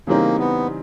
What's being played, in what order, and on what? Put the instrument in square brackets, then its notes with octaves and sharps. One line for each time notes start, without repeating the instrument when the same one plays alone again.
[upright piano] C#3 E3 G3 C4 D#4 [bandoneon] A#3
[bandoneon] B3